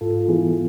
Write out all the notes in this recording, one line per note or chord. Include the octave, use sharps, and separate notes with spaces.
G#2 F4 A4
F4
E3 B3 E4 G#4